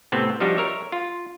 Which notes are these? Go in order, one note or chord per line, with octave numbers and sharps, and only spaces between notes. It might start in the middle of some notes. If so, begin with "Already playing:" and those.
A2 C3 B3 C4
F3 G3 D4 D#4 F#4 G4
A#4 C#5 E5
F4